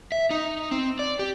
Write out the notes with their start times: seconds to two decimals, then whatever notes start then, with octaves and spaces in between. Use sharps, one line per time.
0.12 E5
0.31 D#4
0.71 C4
0.99 D5
1.19 G4